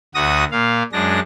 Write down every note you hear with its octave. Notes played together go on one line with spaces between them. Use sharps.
D2 F#4 D#6 A#6
A#2 F5
F#2 G#3 D4 A#6